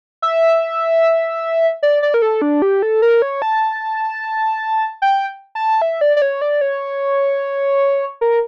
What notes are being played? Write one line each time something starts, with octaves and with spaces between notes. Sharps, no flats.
E5
D5
D5
A#4
A4
D4
G4
A4
A#4
C#5
A5
G5
A5
E5
D5
D5
C#5
D5
C#5
A#4